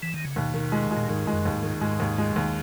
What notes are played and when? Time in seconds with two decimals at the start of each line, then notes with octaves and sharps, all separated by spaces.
0.03 E3
0.14 D#3
0.24 C#3
0.36 D#2 B2
0.54 D#3
0.72 G#3
0.91 G#3
0.97 A#2
1.09 G#2 D#3
1.27 G#3
1.33 F#2
1.45 D#2
1.57 G#2
1.63 D#3
1.81 G#2 G#3
2.00 D#2
2.18 G#3
2.36 D#2